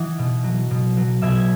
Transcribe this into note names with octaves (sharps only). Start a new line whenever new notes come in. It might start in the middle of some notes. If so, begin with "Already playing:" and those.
Already playing: E3 D#5 F#5
B2
F#3
B2
F#3
B2 E5 G#5